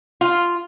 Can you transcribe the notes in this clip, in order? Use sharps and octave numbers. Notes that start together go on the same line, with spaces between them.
F4